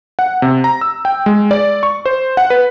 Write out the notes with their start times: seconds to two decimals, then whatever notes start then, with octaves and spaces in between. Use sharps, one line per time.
0.19 F#5
0.42 C3
0.64 A#5
0.81 E6
1.05 G5
1.26 G#3
1.51 D5
1.83 C#6
2.06 C5
2.37 F#5
2.50 B4